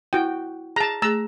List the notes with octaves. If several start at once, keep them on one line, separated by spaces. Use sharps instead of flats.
E4 F#4 G5
G#4 A5 A#5
A3 G#4 A#5 E6